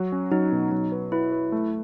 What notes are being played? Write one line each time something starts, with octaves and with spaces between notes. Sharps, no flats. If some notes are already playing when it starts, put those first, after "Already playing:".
Already playing: F#3 F#4
C#4
F#3 D#4
B2
F#3
B4
E4 B4
B4
A3